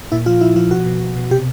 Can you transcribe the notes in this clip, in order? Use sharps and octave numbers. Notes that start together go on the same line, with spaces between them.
A#2 E4
F3 F4
F3 E4
F3 F4
B2 F#4
B2
B2
B2
C3 G4